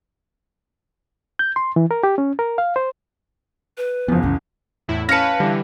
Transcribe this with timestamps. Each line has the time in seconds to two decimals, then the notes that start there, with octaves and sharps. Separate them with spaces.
1.39 G6
1.56 C6
1.76 E3
1.91 A#4
2.03 G4
2.18 C#4
2.39 A#4
2.58 F5
2.76 C5
3.77 B4
4.08 F#1 E2 F3 B3
4.24 C2 F#2 E3 C#4
4.88 E2 A2 E4
5.09 C#4 B4 F5 A5 A#6 C#7
5.40 D3 E3 G3